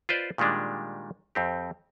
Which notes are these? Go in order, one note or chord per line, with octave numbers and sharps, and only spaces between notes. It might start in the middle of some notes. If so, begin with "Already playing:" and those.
F4 B4 C5 D5 D#5
A#2 D#3 G3 G#3 D4
F2 C4 G4